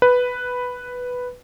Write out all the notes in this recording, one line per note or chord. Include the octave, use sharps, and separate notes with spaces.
B4